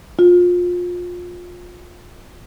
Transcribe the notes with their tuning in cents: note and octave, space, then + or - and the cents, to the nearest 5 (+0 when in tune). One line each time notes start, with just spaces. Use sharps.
F4 +25